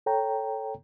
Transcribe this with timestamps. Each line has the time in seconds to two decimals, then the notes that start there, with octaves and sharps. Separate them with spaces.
0.06 A4 C#5 G5 A#5